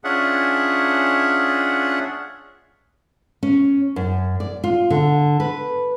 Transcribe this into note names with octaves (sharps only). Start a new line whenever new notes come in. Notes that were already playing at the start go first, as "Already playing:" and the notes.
C#4 D4 F4 G#4 E5 F#5
C#4
F#2
D5
F4
D3
B4